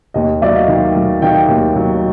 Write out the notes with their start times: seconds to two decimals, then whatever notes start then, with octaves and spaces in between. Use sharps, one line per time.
0.14 D#2 D#5
0.42 F#3 D5 E5
0.55 D#5 F5
0.68 D#3
0.96 F#3
1.22 D#3 F5 G5
1.49 D#2
1.76 F#3